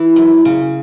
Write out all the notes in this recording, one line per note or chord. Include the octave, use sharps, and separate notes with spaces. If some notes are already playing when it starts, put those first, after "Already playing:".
Already playing: E3
F#2
C#3